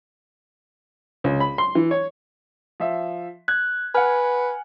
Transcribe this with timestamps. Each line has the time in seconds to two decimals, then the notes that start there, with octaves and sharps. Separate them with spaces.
1.24 C#2
1.40 B5
1.58 C6
1.75 E3
1.91 C#5
2.80 F3 E5
3.48 F#6 G#6
3.95 B4 F#5 G#5 F6